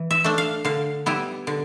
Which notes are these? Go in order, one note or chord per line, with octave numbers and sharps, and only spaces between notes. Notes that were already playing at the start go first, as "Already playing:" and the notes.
Already playing: E3
E5
A3 D4
F5
D3 F5
G3 B3 E4
D3